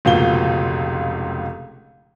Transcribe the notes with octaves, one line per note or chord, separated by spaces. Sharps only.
F1 C#2 B2 A#3 F4 G7